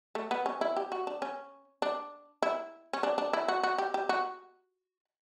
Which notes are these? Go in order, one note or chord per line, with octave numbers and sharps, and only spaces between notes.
A3
B3
C#4
E4
G4
F#4
D4
C#4
D4
E4
C#4
D4
D4
E4
F#4
F#4
G4
G4
F#4